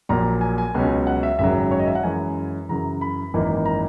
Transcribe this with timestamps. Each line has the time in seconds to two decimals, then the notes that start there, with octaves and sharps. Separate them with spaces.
0.09 A#1 A#2 F#3 A#5
0.41 G#5
0.58 G#5
0.75 C#2 B2 F#3 C#4
1.07 F#5
1.23 E5
1.39 G#1 F#2 C#3 F#3 E5
1.71 C#5
1.79 D#5
1.87 E5
1.95 F#5
2.03 F#2 E3 G#3 C#4 G#5
2.69 F#2 C#3 E3 A#5
3.01 B5
3.34 G#1 F#2 E3 A#3 D#4
3.65 A#5